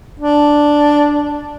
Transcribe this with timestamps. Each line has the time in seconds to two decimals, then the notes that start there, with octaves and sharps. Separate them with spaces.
0.20 D4